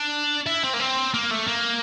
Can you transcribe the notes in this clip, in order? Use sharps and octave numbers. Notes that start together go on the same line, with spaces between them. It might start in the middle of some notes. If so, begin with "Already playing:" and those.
Already playing: D4
E4
C4
A#3
C4
A#3
A3
A#3